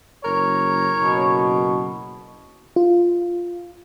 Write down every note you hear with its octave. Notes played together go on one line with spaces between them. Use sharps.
F#1 A#4 C#5
F#1 B2
F4